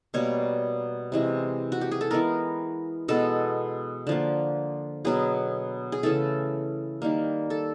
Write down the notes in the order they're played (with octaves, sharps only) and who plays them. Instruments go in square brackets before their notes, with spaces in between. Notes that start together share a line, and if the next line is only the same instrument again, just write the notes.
[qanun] B2 G3 A#3 C#5
C3 E3 G#3
F#4
G4
G#4
A4
E3 G#3 B3 A#4
B2 G#3 B3 A4
D3 F3 A#3
B2 F#3 B3 G#4
G#4
C#3 E3 A3 A4
D#3 G3 A#3
A4